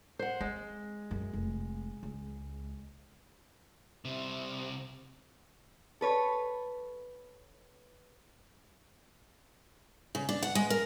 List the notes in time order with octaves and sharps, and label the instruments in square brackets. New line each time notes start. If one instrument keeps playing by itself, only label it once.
[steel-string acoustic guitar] C5 F#5
[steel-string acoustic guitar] G#3 [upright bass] C4
[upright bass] F#2
F1
C#2
[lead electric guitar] C2 C3
[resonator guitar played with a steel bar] A4 B4 C#5
[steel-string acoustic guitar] C#3
D4
F#5
G#3
A#4